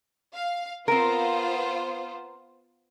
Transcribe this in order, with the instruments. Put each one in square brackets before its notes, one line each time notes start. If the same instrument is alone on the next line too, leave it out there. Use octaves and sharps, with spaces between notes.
[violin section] F5
[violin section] B3 F4 C5 [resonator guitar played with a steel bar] C4 A#4